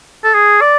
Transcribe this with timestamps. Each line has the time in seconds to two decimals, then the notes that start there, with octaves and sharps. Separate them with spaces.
0.24 A4
0.34 G#4
0.61 D5